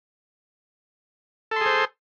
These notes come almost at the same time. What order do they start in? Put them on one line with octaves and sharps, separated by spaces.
A4 C6 G#4 C5